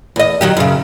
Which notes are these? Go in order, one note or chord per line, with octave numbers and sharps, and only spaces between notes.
E2 D#5
D#3 F#3 G4
F#2 C#3